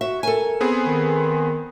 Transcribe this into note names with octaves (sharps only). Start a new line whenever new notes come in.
F#4 E5
A4 A#4 G#5
B3 C4 G#4
D#3